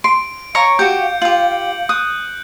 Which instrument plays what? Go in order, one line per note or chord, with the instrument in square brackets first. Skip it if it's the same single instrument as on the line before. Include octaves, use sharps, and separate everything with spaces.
[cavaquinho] C6 [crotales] D7
[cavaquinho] C#5 A#5 C#6 [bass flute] F5 [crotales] C#7
[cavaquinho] F#4 G4 [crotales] G6
[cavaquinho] F4 G4 [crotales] F#7
[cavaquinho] D#6 [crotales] F#6